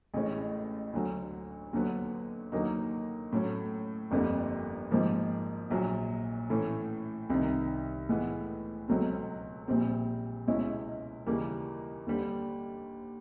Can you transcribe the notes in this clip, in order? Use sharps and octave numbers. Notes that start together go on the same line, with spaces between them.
A1 A2 E3 G#3 C#4
D2 D3 F#3
D#2 D3 F#3 B3
D#2 D3 F#3 A#3 D#4
A2 F#3 A3 C#4
G1 F2 D3 G3 A#3
G#1 G#2 F3 A#3
A#1 A#2 F#3
A2 E3 A3 C#4
C2 C3 D#3
A2 E3 G#3 B3
C#2 B2 F#3 A3 C4
A#1 A#2 G3 C4
C#2 B2 G#3 C#4 E4
D#2 C#3 E3 G3 A#3
D#2 D3 G3